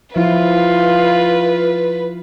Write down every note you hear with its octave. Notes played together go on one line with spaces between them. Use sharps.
F3 E4 F4 B4